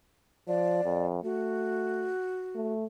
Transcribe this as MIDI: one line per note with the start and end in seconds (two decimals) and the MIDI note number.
0.48 0.82 53
0.48 1.06 74
0.85 1.21 41
1.24 2.12 57
1.24 2.73 66
2.55 2.85 57